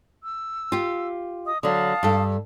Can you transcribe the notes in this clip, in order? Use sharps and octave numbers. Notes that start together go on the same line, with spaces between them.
E6
F4 G4
D#5 D#6
D3 F#3 F5 A5 D#6
G2 A4